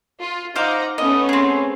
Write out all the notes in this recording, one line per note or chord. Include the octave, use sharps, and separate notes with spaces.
F4
D#4 C5 F5 F#5 A#5 D6
A3 B3 C#4 D#5
C4 G#4